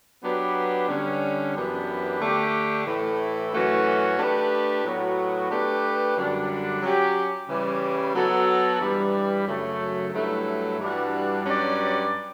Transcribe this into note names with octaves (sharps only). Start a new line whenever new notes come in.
F#3 B3 D4 G4 B4
D3 G3 C#4
F#2 E3 B3 D4 G4
D3 A3 D4 G4
A2 E3 A3 E4
F#2 E3 A3 C#4 F#4
A3 D4 G4 B4
A2 F#3 B3 F#4 C#5
A3 D4 G4 B4
F#2 D3 G3 D4
F#3 C#4 G4
C#3 E3 G3
F#3 B3 F#4 A4
G2 E3 G3
F#2 C#3 F#3 A3
G2 F#3 A3 E4
G2 E3 G3 D4 F#4
G2 F#3 C#4 G4 D5